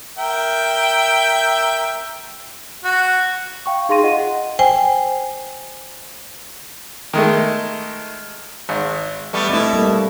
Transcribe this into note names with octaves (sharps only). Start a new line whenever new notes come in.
A#4 E5 G5
F#4
F5 G5 C#6
D#4 G#4 F5 C6 A#6 D#7
F4 D#5 F#5
F#5
C5 G5 G#5
D#3 G#3 A3
G#1
G3 A3 B3
B2 A3 C4 E4
G3 A3 A#3